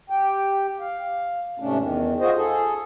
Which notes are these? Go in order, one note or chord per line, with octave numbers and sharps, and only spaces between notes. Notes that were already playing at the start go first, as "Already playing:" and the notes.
G4 G5
F5
G#2 C3 A3 C#4 D4
E2 D#3
F4 F#4 G#4 C5 D#5
G#4 A4